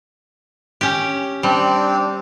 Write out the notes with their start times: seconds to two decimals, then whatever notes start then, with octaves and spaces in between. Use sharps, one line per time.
0.81 C#4 G4
1.43 G3 C4 D4